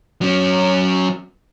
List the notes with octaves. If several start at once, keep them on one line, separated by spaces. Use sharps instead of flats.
F#3 C#4